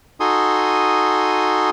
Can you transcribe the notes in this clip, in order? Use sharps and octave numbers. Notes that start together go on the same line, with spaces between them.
D#4 F#4 A4 G#5 C6 D#6